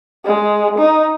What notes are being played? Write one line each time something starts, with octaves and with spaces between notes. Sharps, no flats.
G#3
D#4